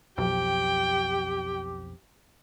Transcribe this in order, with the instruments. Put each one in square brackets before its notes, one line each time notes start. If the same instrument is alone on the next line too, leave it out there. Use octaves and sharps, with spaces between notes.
[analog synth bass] B1 [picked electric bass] F2 [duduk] G4 [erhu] G5